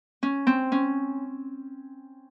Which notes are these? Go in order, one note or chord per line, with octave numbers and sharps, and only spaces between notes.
C#4
C4
C#4